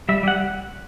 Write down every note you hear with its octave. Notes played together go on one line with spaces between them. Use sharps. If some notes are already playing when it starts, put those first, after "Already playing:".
G3 E5
G3 F#5